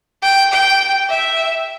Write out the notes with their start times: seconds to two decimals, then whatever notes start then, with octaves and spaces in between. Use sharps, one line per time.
0.22 G5
0.52 G5
1.10 E5